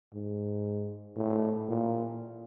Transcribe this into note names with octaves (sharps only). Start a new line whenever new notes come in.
G#2
A2
A#2